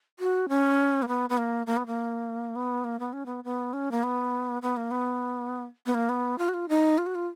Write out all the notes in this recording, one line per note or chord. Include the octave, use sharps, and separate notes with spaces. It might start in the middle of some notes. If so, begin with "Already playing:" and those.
F#4
C#4
A#3
B3
B3
A#3
A#3
B3
A#3
B3
A#3
B3
C#4
B3
B3
C#4
A#3
B3
B3
A#3
B3
B3
A#3
B3
F4
F#4
F4
D#4
F4
F#4
F4